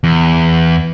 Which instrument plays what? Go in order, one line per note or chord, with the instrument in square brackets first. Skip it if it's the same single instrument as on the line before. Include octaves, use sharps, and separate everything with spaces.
[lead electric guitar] E2